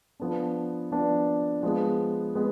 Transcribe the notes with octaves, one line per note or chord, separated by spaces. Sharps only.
F3 B3 D4
F3 B3 D4
F3 G#3 B3
G#3 B3